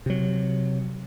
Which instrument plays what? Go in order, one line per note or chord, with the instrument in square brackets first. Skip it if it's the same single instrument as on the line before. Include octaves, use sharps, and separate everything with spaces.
[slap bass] C3 F#3